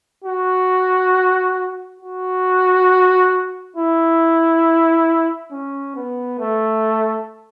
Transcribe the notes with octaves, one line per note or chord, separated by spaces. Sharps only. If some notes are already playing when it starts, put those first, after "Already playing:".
F#4
F#4
E4
C#4
B3
A3